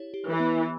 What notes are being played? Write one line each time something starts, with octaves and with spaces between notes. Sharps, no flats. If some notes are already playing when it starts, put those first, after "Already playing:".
Already playing: E4 G4 C#5
G4
E3
B3